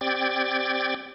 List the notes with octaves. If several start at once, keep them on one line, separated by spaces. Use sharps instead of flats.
C4 G4 D5 G5 G#6 A6